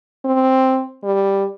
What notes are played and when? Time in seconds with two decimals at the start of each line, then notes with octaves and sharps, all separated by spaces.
0.25 C4
1.04 G3